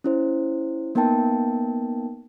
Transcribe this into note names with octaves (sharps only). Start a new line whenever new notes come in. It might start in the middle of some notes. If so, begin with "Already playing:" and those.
C#4 E4 C5
A#3 B3 D#4 A#4 G5 A5